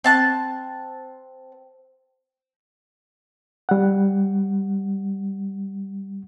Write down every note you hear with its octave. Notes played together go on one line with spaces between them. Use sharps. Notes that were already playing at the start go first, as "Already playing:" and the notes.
C4 A5 F#6
G3 F#5